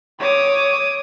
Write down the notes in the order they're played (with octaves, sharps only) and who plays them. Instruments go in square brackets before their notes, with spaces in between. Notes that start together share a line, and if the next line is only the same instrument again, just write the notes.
[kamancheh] C#5 [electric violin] D6 D#6